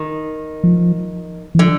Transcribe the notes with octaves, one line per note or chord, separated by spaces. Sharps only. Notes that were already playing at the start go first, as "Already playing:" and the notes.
Already playing: D#3
F3
E3
D3 F3